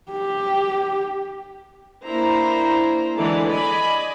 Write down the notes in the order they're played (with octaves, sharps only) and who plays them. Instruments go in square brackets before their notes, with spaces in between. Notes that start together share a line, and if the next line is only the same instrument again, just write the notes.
[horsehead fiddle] G4
[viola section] A#3 D4 E4 C5 A#5
D3 E3 G#3 D5 A5
D5 D#5 G#5 B5